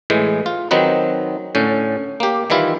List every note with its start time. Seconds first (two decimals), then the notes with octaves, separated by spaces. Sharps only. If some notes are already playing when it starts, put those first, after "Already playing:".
0.10 A2 E3 G#3
0.46 F4
0.71 D#3 F#3 C4 D#4 B4
1.55 A2 D3 C#4
2.20 A#3 G4
2.50 D#3 E3 G3 E4 F4